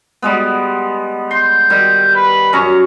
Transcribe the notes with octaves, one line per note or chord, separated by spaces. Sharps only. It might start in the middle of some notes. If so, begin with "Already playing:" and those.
G3 G#3 B3
C6 G6
D#3 G3
B4
F#2 C#4 A#5 C#6